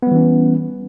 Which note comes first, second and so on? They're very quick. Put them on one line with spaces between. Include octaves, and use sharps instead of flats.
B3 G3 E3 C#4